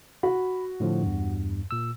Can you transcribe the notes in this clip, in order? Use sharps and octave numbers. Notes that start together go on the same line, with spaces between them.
F#4 B5
A2 D3 F3
E2 G2
A#2 E6